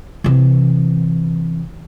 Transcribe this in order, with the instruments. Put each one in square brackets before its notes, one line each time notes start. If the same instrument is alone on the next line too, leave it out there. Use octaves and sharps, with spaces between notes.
[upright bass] C3 E3